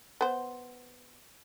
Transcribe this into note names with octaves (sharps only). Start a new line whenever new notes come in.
B3 C5